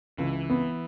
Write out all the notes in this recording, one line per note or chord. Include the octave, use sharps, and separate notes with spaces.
C#2 E3
B3